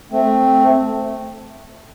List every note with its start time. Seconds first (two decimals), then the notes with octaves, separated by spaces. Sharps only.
0.12 A3 C4